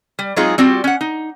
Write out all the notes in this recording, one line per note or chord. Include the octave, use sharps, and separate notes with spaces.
G3
F#3 G#3 C4 D#4 F4 G#4
G3 C4 F4 F#4
C#4 F#5
D#4